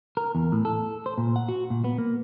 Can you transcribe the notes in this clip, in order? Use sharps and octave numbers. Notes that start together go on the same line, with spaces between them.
A#4
E2
A2
A4
C5
A#2
F#5
F#4
A#2
B3
A#3